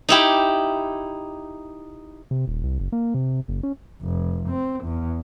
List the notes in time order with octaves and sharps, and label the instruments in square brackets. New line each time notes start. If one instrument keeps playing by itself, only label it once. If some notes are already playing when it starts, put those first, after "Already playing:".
[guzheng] D#4 E4 G4
[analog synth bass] C3
D#1
C2
F#1
A#3
C3
F#1
C#4
[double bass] F1
C4
E2